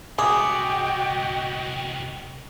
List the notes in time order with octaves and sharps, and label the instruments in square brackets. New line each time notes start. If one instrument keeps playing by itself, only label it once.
[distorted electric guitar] C2 B3 [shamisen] G#3 [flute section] F#4 D#5 G5 [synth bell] D6 D#6